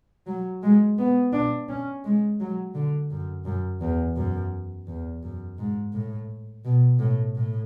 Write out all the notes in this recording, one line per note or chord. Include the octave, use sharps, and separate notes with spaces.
F#3
G#3
B3
D4
C#4
G#3
F#3
D3
F#2
F#2
E2
F#2
E2
F#2
G#2
A2
B2
A2
A2